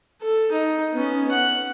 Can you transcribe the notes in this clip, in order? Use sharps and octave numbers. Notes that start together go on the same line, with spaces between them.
A4
D#4
B3 C#4
F#5